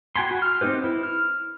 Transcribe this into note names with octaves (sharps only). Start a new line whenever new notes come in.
F#4 G5 G#5 B5 C6
F#4
F6
C4 D4 D#4 G4 B4
E4
F6